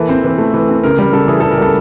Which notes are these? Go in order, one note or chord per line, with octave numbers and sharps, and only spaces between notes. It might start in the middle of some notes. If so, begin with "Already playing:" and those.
Already playing: E3 A#3 A4
C4
E3
A3
E3
C4
C#3 A#4
G3 A#4
C#3 A4
E3 G#4
C#3 A4
A#4
G3 A4